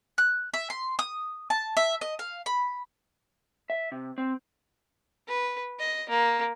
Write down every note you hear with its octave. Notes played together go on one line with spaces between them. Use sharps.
F#6
E5
C6
D#6
A5
E5
D#5
F5
B5
E5
C3
C4
B4
D#5
A#3